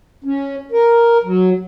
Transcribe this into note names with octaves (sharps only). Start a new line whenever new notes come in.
C#4
A#4
F#3